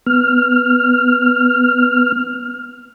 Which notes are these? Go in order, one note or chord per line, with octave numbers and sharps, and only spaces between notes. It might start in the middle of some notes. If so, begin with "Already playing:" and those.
B3 F6